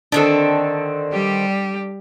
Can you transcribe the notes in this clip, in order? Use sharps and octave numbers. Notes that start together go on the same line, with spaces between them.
D3 D#3 C4 D4 A4
G3 G4